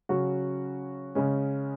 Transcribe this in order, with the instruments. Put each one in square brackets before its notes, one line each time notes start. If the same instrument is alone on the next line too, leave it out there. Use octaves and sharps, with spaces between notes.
[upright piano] C#3 F#3 C#4 F#4
C#3 G#3 C#4